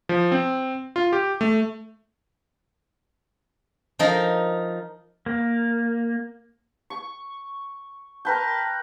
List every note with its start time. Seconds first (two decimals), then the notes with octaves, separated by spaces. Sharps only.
0.09 F3
0.32 C4
0.96 F4
1.13 G4
1.41 A3
3.99 F3 D#4 A#4
5.26 A#3
6.90 C#6
8.25 A#4 B4 G5 A5